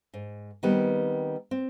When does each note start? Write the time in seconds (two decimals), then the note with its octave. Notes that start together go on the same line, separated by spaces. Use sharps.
0.14 G#2
0.63 D#3 G3 B3 C4
1.51 C4